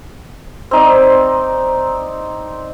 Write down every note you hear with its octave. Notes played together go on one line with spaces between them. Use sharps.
C4 D#4 D5